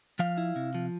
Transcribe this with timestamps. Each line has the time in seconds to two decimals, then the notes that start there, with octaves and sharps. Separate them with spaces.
0.19 F3 F5
0.38 E4
0.56 C3
0.75 F3